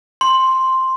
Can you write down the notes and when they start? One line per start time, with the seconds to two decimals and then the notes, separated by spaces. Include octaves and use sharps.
0.21 C6